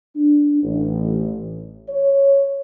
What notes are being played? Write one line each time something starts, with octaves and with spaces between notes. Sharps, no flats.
D4
A1
C#5